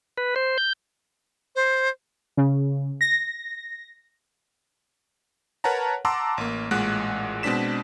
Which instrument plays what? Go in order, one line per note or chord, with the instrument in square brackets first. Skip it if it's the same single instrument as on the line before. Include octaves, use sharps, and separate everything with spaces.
[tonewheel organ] B4
C5
G6
[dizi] C5
[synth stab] C#3
A#6
[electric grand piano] A#4 B4 C#5 F#5 A5 A#5
F#5 A5 A#5 C6 D6 E6
A1 A#3
A1 A#2 G#3 F#5 F#6
B2 G#3 C4 D4 B6 E7